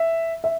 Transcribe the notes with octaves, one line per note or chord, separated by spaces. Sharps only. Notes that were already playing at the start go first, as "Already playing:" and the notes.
Already playing: E5
E5